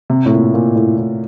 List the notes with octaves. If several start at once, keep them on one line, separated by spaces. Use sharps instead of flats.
C3
A2
A#2
A#2
A2
A2